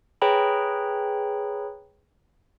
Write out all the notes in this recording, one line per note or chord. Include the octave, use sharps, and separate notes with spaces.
G#4 B4 C#5 G5 A#5 B5